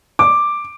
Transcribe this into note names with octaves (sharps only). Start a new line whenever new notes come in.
D6